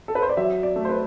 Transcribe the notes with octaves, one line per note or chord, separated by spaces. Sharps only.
A4
B4
C5
D5
F#3 E5
D5
A3
C5
B4